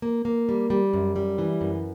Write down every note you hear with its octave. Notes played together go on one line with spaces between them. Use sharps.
A#3
A#3
G3
G3
F#2
G3
E3
F#2